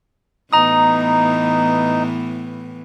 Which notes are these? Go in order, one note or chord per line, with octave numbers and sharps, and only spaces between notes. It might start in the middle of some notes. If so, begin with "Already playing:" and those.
A2 E3 B3 D#4 A#5 D#6